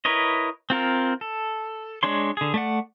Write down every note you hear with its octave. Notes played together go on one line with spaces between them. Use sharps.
E4 A#4 B4 C#5 D#5
C4 F4 A#4
A4
G#3 D4 C#5 C6
D3 G#4
A3 D5 F#5